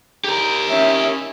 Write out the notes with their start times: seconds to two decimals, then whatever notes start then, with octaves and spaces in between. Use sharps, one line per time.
0.24 G4 A#4
0.69 C#4 E5